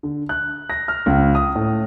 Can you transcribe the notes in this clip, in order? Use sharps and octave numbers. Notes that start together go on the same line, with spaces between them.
D3
F#6
A#6
F6
C#2
D#6
A2